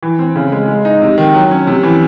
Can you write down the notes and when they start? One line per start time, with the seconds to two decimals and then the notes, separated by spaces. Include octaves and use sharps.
0.03 E3
0.19 C4
0.36 C#3
0.52 G#3
0.68 G#3
0.85 D#4
1.02 C3
1.18 D#3
1.34 F#3
1.51 C#4
1.67 C3
1.83 E3